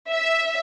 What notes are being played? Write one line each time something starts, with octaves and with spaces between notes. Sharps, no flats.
E5